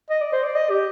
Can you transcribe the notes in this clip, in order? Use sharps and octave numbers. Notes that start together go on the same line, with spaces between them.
D#5
D5
C5
D5
D#5
G4